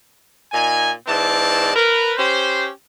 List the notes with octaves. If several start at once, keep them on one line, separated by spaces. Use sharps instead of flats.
A#2 D#4 G#5
G#2 E3 C4 D5 A5
A#4 B4
C#4 G4 C5